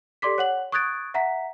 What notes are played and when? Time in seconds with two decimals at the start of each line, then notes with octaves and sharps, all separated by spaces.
0.22 G4 A4 D5 C6 D6 B6
0.38 C#5 F#5 F#7
0.72 C#6 D#6 F#6 G#6 A6 D7
1.14 E5 F#5 A#5 B6